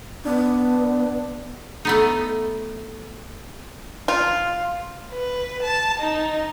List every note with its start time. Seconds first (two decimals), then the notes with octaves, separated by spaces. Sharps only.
0.25 B3 D4
1.85 A3 B3 D#4
4.08 F4
5.13 B4
5.64 A5
6.01 D#4